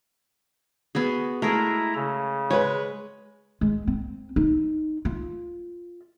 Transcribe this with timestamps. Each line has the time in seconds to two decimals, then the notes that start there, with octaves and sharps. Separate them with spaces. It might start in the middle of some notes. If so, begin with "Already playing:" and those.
0.95 B3 F#4 G#4
1.42 G#3 A3 E4 G#4 A#4 A#5
1.95 C#3
2.51 G#3 B4 C#5
3.61 G#3
3.88 C4
4.36 D#4
5.05 F4